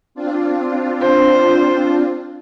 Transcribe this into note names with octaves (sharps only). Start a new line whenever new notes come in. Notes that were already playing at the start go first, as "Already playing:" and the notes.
C4 D4 F4
C5